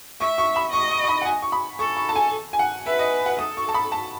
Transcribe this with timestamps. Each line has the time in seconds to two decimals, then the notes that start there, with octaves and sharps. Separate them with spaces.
0.20 E5 C#6
0.38 C#6
0.56 B5
0.73 D#5 C#6
0.90 C#6
1.04 C#6
1.08 B5
1.22 F#5
1.26 G#5
1.42 C#6
1.52 B5
1.79 A4 C#6
1.97 C#6
2.09 A5
2.16 G#5
2.53 G#5
2.59 F#5
2.86 B4 E5
2.99 D#5
3.26 F#5
3.39 A4 D#6
3.57 C#6
3.69 A5
3.74 B5
3.92 A5